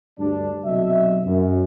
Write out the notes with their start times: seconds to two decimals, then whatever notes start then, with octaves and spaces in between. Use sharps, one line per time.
0.19 D2 G2 D4
0.65 B1 C3 F#3 F#4 D#5 E5
1.26 F#2